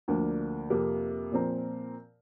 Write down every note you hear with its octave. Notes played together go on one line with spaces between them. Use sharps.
D2 D3 F3 A#3
F2 C3 A#3
A#2 F3 C4 A#4